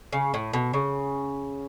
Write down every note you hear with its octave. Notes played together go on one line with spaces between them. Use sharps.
C#3
A2
B2
C#3